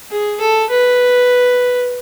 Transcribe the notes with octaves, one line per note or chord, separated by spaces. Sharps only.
G#4
A4
B4